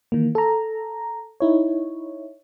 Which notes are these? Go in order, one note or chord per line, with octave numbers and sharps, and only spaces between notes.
D#3 E3 A#3
A4 A#5
D#4 E4 C#5